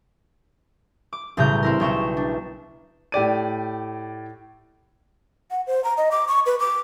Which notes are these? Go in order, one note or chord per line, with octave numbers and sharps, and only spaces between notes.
D6
B1 A2 C#3 G3 A#5 G6
C4 E4 A#4
B1 G5 C#6 E7
D4
A2 G4 D5 D#7
F#5
C5
A#5
D#5
D6
C#6
B4
D6